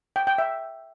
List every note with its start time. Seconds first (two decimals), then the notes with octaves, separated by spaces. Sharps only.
0.16 G5
0.27 G5
0.38 E5